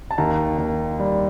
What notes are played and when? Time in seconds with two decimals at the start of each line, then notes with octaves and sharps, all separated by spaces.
0.11 A5
0.18 D#2 A#5
0.58 D#2
0.99 G3